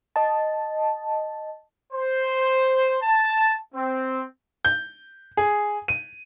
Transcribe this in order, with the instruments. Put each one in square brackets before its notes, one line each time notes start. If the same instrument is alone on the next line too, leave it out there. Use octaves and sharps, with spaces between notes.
[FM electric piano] D#5 A5
[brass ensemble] C5
A5
C4
[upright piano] G6
G#4
D#7